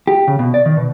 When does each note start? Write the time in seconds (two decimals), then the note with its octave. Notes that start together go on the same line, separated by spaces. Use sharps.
0.07 G4
0.28 C#3
0.39 B2
0.54 D5
0.66 D#3
0.77 B2